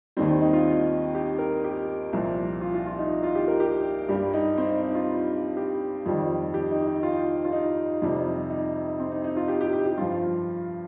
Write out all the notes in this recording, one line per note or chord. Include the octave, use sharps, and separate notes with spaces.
D#2 D#3 G3 C4
C4
D#4
F4
G4
A#4
G4
C2 A#2 F3
F4
F4
F4
D#4
F4
G4
A#4
G4
G2 G3 G4
D#4
C4
D#4
F4
G4
F2 D#3 G3
G4
D#4
D#4
F4
F4
D#4
F2 C3 G3
D#4
C4
D#4
D#4
F4
G4
G4
G4
G4
G2 F3 F4